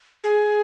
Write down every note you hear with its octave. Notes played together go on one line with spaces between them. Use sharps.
G#4